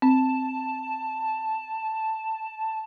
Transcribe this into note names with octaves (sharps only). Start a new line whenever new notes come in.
C4 A5